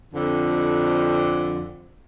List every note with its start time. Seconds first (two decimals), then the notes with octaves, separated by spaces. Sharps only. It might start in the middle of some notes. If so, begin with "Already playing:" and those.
0.14 F2 D3